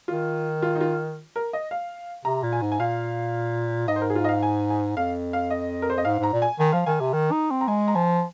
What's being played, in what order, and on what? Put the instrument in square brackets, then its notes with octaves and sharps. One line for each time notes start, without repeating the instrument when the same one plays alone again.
[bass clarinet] D#3 [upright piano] F4
[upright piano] F4
D#4
F4
A#4
D#5
F5
[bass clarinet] C3 [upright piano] A#5
[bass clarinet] A#2
[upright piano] G#5
[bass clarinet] G#2
[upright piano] G#5
[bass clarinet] A#2 [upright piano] F5
[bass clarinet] G#2 [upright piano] D#5
[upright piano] C5
A#4
G#4
F4
D#5
F5
G#5
G#5
[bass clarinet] F2 [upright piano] F5
[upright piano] F5
D#5
A#4
C5
D#5
[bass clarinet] G#2 [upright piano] F5
[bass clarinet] G#2 [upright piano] A#5
[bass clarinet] A#2
[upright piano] G#5
[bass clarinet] D#3 [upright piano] G#5
[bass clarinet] F3 [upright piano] F5
[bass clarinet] D#3 [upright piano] G#5
[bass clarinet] C3
D#3
D#4
C4
[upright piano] A#5
[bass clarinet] G#3 [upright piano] G#5
[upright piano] A#5
[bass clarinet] F3 [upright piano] G#5